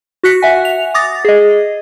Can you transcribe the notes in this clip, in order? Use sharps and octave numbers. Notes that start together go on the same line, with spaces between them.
F#4 F#6 B6 C#7
E5 F#5 G#5
F7
D6 D#6 A6 A#6
G#4 D#5